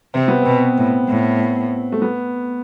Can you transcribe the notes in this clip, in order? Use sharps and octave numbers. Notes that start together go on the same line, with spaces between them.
C3 C4
B3
B2 C4
A2
A2
A3
B3